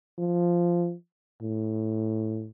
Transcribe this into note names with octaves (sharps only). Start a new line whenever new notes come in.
F3
A2